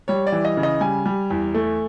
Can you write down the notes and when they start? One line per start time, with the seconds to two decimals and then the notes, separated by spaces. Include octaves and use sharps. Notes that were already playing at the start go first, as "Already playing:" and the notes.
0.08 G3 C#5
0.27 D5
0.32 E3
0.45 D#5
0.57 C#3
0.63 D#5
0.81 G3 G#5
1.06 G3
1.30 E2
1.54 A3